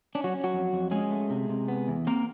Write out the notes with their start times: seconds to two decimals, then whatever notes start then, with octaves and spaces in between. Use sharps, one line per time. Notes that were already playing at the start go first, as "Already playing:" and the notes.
0.15 C#4 D4
0.24 F#3 F#4
0.34 C#4
0.44 F#3 F#4
0.53 F2
0.73 F2
0.91 G#3 C#4 G#4
1.11 A3
1.30 C3
1.50 C3
1.68 B3
1.88 E2
2.07 A#3 C4 A#4